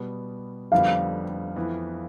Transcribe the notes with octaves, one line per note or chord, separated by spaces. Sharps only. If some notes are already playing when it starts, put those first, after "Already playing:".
Already playing: B2 G3 B3
F1 F2 D3 G3 B3 F5
F2 E3 B3